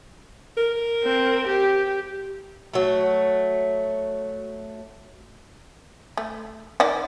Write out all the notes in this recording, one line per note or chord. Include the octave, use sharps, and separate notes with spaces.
A#4
C4
G4
F#3 A3
A3
D#3 D5 F#5